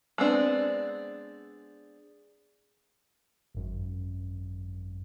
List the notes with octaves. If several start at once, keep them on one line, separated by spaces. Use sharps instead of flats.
G#3 B3 C4 D4
G#1 F#2